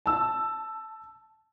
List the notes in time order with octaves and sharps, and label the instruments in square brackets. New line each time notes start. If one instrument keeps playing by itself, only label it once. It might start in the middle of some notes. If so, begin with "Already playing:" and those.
[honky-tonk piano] A5 E6